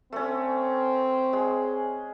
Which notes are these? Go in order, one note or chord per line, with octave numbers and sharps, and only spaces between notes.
A3 C4 C#4
G#3